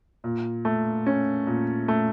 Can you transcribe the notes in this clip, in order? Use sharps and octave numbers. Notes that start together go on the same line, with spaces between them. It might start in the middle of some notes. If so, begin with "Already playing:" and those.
A#2
A3
C#4
A#2
A3